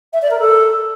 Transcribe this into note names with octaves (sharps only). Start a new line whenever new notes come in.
E5
D5
A#4
A4